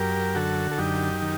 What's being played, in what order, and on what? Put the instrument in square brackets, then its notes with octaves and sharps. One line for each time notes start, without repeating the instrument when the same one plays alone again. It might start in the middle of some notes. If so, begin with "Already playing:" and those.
Already playing: [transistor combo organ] F#2 G4 A#4
D3 F#4 A4
A4
F#2 D#4 G4
D#3